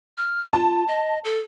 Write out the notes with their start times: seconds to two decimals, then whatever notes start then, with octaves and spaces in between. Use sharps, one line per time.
0.17 F6
0.53 F4 A5
0.88 D#5
1.24 A4